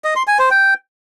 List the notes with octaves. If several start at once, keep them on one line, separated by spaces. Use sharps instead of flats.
D#5
C6
G#5
C5
G5